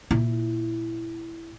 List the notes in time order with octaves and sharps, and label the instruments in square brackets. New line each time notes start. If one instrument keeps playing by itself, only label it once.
[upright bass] A#2 E4